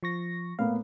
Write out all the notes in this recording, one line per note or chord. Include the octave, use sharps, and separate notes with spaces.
F3 C#6 A#6
A2 A#3 B3 F5